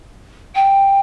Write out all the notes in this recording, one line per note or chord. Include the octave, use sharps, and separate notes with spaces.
G5